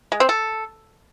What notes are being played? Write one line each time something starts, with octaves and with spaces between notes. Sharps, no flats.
G#3
C4
A4